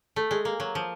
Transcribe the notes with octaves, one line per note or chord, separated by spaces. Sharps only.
A3
G#3
A#3
F#3
F3